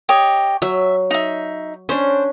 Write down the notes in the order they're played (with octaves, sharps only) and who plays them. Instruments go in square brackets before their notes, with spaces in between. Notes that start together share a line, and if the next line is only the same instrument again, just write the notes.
[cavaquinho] G4 C#5 D#5
[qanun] F#3 [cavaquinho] E5
[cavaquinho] D#4 E5
[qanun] C#4 D4 [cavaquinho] C5